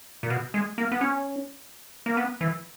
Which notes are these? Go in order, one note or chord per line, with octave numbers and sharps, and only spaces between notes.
A#2
B2
G#3
A#3
B3
C#4
A#3
B3
E3